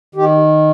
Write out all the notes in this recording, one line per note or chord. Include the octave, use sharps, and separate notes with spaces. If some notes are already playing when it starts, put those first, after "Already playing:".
D#3 G4